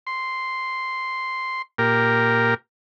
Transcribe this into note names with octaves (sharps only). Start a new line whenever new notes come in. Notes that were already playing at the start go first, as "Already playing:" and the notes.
C6
A#2 G4 A#4